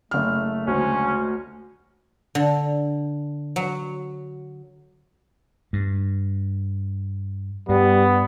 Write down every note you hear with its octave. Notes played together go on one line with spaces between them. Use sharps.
F#1 A3 F6
D2 G#3 C#4
D3
F#3
G2
G2 G3 B3